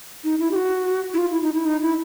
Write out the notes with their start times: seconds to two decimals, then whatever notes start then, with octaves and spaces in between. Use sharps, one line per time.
0.24 D#4
0.39 E4
0.51 G4
0.56 F#4
1.14 E4
1.18 F4
1.31 E4
1.42 D#4
1.54 E4
1.66 D#4
1.82 E4